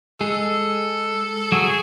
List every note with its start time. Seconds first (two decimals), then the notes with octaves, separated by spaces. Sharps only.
0.20 G#3 G#4 A4
1.52 F#3 F#4 G#4